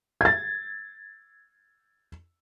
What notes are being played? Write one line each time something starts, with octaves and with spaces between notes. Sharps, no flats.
G#6 A6